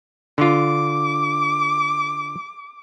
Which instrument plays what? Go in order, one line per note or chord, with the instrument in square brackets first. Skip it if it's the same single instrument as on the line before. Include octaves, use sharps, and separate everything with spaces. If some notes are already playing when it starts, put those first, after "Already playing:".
[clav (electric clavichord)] D3 F4 [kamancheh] D6